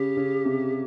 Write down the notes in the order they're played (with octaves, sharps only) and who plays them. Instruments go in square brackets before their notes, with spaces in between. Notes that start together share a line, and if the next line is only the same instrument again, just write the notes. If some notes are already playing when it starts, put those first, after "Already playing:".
Already playing: [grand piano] C#3 [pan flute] G4
[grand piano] C#3
C3